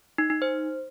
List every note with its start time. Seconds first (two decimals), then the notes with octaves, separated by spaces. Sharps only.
0.18 D#4
0.30 D#4
0.42 C5